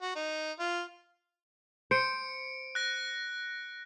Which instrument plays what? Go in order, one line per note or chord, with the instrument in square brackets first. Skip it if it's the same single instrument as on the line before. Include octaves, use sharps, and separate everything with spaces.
[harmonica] F#4
D#4
F4
[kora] C5 [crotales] C#7 D7
[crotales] F#6 A#6